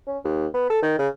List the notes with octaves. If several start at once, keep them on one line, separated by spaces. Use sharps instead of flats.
C#4
D#2
B3
A4
D#3
C#3